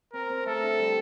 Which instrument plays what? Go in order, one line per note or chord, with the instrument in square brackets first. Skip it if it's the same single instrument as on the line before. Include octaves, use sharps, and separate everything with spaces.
[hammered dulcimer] C4 [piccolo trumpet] A#4
[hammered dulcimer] C4
[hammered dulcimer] A3 [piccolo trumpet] A4
[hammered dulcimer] D3
G3